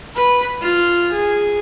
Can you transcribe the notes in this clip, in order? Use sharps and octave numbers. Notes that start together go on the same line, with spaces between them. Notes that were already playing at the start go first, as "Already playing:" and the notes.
B4
F4
G#4